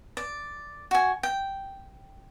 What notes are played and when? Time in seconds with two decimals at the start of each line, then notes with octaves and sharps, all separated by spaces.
0.17 D5
0.91 F#4 G#5
1.23 G5